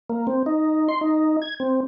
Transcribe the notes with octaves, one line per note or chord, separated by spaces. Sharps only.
A#3
C4
D#4
C6
D#4
G#6
C4